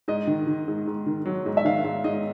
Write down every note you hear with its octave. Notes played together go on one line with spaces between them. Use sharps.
G#2 D#5
D#3
D#3
G#2
G#2
D#3
F#3
G#2
E5
D#3 F5
G#2 F5
G#2 D#5